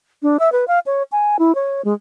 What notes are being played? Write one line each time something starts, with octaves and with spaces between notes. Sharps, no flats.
D4
E5
B4
F5
C#5
G#5
E4
C#5
G#3